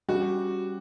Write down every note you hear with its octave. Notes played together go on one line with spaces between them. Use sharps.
G3 C#4 F#4 G4